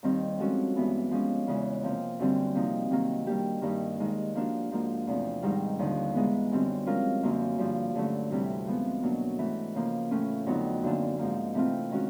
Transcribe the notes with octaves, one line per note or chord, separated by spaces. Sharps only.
D#2 D#3 G3 C4 D#4
F3 G#3 C#4 F#4 A4
G2 E3 G#3 B3
F3 G#3 C#4
E2 C#3 E3 G#3
C3 F3 A#3
F#2 D3 G3 C4
C3 F3 A#3 D#4
C3 D#3 F#3 A#3
D#3 G3 A#3 D4 G4
G2 D#3 G3 A#3 D#4
D#2 D#3 G#3
F3 A#3 D4 F#4
G#2 F3 A#3
E2 C3 F3 A3
G#2 D#3 G3
D#2 D3 F3
G#2 E3 G#3 B3
F#2 D3 G3 C4
F3 G#3 C#4 F4 A#4
F#2 D3 F3 A#3
G2 D3 F3
G2 D3 F#3 A3 C#4
D2 C3 E3 G3
F3 G#3 B3
B2 F#3 A#3 D4
G#2 E3 A3
C#3 F3 A#3
A2 E3 A3 C#4 F4
F2 D3 F#3 B3 D#4
F#2 D3 F3 A#3 D4
G#2 F3 A#3
C3 E3 A3 C4 F4
D#3 G#3 C#4 F#4